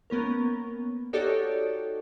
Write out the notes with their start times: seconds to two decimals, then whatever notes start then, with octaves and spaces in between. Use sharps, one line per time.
0.10 A#3 B3 C#4 A#4
1.13 D#4 F#4 G4 A4 C#5 D5